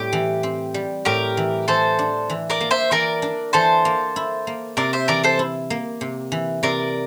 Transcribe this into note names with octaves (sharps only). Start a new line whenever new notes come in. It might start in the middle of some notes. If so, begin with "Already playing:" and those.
Already playing: A2 G3 C4 G4
E3
C4
G3
A2 G4 A#4
E3
E3 A4 C5
D4
E3
A#4 D5
A#3
C5 E5
E3 A#4 D5
D4
E3 A4 C5
A#3
E4
A#3
C3 A#4 D5
C5 E5
E3 A#4 D5
A4 C5
E4
A#3
C3
E3
C3 A#4 D5